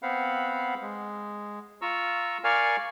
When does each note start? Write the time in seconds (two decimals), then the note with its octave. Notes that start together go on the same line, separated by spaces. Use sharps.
0.02 B3 C4 C5 F5 F#5 B5
0.81 G#3
1.82 F4 A#5 C#6 E6
2.44 A#4 D5 F5 G#5 C#6 F6